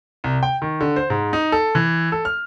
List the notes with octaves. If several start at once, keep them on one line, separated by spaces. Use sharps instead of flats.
C2
G5
D#3
D3
C5
G#2
D#4
A4
E3
A4
F6